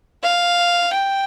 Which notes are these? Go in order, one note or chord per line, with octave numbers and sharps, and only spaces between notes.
F5
G5